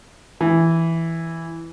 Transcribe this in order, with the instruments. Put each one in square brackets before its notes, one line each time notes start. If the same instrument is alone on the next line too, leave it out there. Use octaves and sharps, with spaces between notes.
[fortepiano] E3